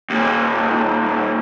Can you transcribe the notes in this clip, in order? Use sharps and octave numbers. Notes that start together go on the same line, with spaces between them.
D#2 A#2